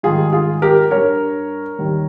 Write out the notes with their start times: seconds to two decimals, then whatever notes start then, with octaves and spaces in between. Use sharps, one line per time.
0.03 G#2 D#3 G3 F4 G#4
0.32 F4 G#4
0.62 G4 A#4
0.91 G2 G3 A#4 C#5
1.79 D#2 D#3 G3